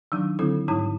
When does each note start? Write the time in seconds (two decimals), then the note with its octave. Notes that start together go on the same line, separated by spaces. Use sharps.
0.12 D#3 F#3 D4 D#4
0.39 D3 F#3 C4 E4 A4
0.68 G#2 G3 D#4 E4 C#5 D#6